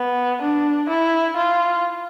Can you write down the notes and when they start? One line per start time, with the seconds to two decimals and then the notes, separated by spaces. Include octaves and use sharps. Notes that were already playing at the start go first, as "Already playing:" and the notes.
Already playing: B3
0.42 D4
0.89 E4
1.37 F4